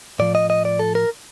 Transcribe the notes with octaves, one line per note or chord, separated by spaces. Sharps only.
A2 F3 D5
D#5
D#5
D5
A4
A#4